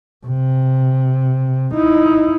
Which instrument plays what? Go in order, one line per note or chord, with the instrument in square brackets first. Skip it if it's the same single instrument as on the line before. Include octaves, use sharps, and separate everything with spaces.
[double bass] C3
D#4 E4